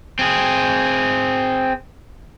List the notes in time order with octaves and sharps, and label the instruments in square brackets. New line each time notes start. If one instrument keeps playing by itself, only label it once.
[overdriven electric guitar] C4 G#4